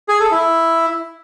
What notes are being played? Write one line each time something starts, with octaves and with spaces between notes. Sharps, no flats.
G#4
A4
E4